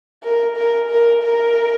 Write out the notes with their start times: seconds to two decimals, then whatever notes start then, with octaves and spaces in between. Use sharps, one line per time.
0.23 A#4
0.56 A#4
0.90 A#4
1.22 A#4